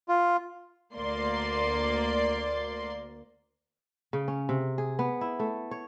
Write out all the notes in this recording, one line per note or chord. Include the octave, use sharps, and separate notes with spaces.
F4
D2 A#3 D5 C6
C#3
C#4
C3
G#4
B3
E4
A3
C#5